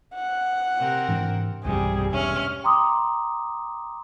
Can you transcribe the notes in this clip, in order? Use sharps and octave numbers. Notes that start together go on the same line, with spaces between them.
F#5
C3 C4 A#4
G#2 E3 D4
B1 E2 G2 C3 G3 G#4
E1 C#4 D4 E5 F6
G5 A#5 C6 D6 D#6